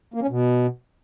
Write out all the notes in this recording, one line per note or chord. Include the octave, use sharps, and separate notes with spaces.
A#3
C#4
B2